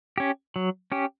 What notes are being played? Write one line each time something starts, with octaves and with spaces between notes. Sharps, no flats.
C#4 G4
F#3
C#4 G4